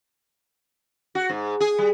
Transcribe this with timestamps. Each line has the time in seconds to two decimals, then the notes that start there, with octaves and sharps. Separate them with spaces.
1.15 F#4
1.30 G#2
1.60 G#4
1.79 G3